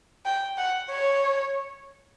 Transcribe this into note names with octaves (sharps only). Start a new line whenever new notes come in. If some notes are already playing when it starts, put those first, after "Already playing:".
G5
F#5
C#5